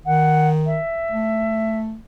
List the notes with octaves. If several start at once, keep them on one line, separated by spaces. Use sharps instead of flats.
D#3 F#5
E5
A3